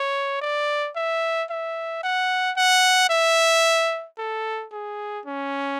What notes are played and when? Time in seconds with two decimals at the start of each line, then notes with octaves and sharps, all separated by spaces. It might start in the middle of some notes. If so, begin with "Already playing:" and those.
Already playing: C#5
0.42 D5
0.96 E5
1.50 E5
2.03 F#5
2.57 F#5
3.10 E5
4.18 A4
4.72 G#4
5.26 C#4